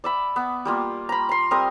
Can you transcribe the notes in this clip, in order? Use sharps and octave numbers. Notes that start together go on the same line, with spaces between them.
D5 E5 B5
B3
G3 A#3 F4
A#5 B5
A#5 C6
G3 C4 A#4 D#6